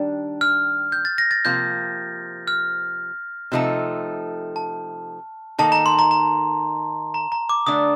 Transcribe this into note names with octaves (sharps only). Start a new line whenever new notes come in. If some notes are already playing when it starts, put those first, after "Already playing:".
Already playing: D#3 G3 D4
F6
G6
A6
A#6
A6
C3 F3 A#3 G6
F6
C3 F3 A3 D#4 A4
A5
D#3 A#3 D#4 A4 A5
A#5
C6
A#5
A#5
A#5
A#5
D6
D3 A3 D4 D#6